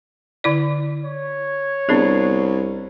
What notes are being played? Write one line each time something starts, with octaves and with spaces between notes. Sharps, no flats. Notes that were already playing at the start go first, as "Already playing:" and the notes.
D3 E4 D5
C#5
C2 B3 D4 G#4